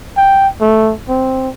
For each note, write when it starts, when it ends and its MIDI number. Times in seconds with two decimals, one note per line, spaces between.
0.17 0.48 79
0.61 0.93 57
1.09 1.49 60